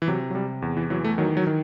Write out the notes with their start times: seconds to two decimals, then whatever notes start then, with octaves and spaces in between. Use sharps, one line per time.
0.02 E3
0.08 C3 F#3
0.30 F#3
0.35 C3 G3
0.62 E2
0.77 E3
0.90 E3 F#3
1.04 A3
1.18 D#3 F#3
1.37 F#3
1.47 D#3